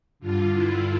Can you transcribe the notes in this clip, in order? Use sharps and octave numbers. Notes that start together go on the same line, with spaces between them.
G2 D3 F4
E4